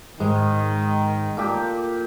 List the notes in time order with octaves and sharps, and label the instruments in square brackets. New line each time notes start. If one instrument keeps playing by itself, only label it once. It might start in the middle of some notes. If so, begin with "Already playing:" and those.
[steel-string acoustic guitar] G#2 [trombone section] D#3 [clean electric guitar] G#3
[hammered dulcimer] A#2 G4 [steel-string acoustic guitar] A4